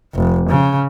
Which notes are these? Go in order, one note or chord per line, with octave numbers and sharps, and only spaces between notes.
F1
C#3